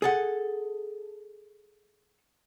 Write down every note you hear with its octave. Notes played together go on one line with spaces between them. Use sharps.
G#4 A4 F#5